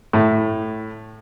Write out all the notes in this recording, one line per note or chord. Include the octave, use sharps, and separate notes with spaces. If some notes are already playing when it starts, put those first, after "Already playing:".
A2